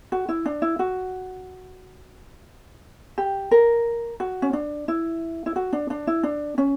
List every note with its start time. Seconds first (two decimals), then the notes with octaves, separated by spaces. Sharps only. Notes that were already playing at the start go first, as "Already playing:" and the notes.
0.12 F#4
0.29 E4
0.46 D4
0.62 E4
0.79 F#4
3.18 G4
3.51 A#4
4.20 F#4
4.42 C#4
4.53 D4
4.88 E4
5.46 E4
5.56 F#4
5.73 D4
5.90 D4
6.07 E4
6.23 D4
6.58 C#4